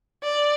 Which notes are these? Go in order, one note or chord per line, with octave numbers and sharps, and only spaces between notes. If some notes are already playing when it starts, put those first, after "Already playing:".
D5